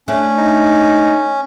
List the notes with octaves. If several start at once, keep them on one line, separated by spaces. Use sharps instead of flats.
A3 C#4 D4 E4
D#4